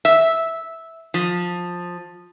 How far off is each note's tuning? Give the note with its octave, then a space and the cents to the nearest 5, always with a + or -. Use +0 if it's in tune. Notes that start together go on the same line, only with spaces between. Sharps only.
E5 -10
F3 +15